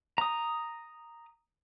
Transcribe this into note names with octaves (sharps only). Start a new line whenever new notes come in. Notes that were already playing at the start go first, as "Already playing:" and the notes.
A#5 D#6